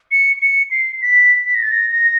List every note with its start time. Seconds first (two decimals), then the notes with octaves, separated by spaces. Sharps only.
0.11 C#7
0.42 C#7
0.71 C7
1.02 B6
1.46 B6
1.55 A#6
1.63 A6
1.72 A#6
1.92 A#6